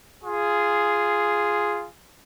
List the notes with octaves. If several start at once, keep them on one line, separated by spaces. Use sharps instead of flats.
F4 G#4